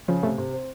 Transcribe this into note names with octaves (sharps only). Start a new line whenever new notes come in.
C#3 F3
C3 A3
C3
C4